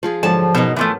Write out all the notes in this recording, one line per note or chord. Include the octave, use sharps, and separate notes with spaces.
F3 F4 G#4
G#2 D3 F3 F#3 A5
B2 B3 C#4 D#4 A#4
E3 F3 A3